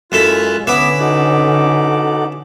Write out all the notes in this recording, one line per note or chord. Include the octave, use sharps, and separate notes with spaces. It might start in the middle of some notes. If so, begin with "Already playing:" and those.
F#2 G#3 A3 E4 F4 F#6
D3 B3 C#4 E4 B4 D6
D#4 F#4 A4 F#5 D6